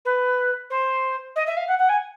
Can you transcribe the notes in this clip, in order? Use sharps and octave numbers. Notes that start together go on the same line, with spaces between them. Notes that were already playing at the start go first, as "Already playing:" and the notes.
B4
C5
D#5
E5
F5
F#5
F#5
G#5